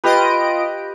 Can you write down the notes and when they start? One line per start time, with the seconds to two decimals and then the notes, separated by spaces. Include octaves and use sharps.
0.04 F4 G4 B4 D#5 D7